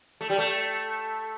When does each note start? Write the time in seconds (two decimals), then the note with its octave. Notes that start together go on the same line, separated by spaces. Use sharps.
0.21 A3
0.30 G3
0.38 A3